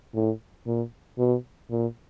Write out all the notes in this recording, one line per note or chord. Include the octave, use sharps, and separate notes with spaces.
A2
A#2
B2
A#2